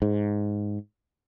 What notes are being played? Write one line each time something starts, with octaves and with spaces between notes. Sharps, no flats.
G#2